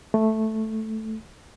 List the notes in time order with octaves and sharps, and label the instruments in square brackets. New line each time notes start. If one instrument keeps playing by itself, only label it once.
[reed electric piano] A3